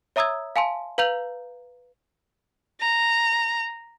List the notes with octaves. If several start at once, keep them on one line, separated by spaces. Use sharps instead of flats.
C#5 E5 A#5 D#6 E6 G#6
F5 G#5 A5 C6
B4 F5 A#5 G6 F7 F#7
A#5